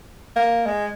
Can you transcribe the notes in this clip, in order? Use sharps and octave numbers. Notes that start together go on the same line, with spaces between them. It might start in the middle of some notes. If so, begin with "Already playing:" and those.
A#3
G#3